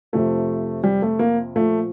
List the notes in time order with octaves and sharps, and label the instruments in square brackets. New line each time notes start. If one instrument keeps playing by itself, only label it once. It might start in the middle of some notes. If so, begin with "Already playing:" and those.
[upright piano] F2 C3 F3 A3
G3
A3
A#3
A#2 F3 A3